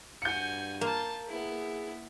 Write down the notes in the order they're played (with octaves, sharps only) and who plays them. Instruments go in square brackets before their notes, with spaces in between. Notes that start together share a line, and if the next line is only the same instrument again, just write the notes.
[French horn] G2 [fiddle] F#4 G#5 [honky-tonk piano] G6 C#7
[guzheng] A#3 [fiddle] F4 A5
[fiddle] B3 E4 [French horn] G#4